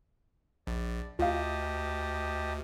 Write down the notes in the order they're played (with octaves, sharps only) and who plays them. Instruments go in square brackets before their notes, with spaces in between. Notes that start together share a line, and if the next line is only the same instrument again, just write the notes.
[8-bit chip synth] A#1 [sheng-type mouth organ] D5
[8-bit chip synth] D2 [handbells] F4 F5 [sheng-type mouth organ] G4 D#5 A5